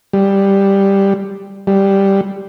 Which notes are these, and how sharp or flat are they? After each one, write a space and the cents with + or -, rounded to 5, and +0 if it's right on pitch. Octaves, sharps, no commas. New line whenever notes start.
G3 +5
G3 +0